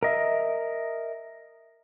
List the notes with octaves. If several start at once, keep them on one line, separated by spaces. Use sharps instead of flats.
A#4 D#5 E5